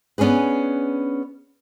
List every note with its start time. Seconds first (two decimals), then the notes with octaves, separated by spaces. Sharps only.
0.18 B3 C#4 D4 G#4 B4